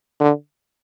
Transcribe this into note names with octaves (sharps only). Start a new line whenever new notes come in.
D3